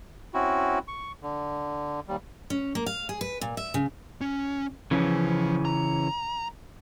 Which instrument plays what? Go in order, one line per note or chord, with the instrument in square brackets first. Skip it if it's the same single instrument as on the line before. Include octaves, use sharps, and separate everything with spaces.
[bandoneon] C4 C#4 E4 F#4
C#6
D3
D#2 G3
[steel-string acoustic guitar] C#4
A#3
F5
G#4
B4
A#2
E5
C#3
[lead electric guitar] C#4
[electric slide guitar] C#3 E3 C#4 [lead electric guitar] F3
[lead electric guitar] A#5